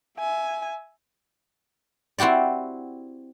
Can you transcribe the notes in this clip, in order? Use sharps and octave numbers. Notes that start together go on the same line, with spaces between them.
E5 G#5
C4 E4 F#4 G4 D5